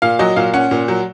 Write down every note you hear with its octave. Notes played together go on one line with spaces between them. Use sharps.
A#2 F5
F#3 D#5
A#2 F5
C#4 F#5
A#2
F#3